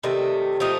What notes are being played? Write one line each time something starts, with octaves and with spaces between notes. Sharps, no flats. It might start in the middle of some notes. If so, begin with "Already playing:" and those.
C3 D#3 A3
F3 A3 D#4 G4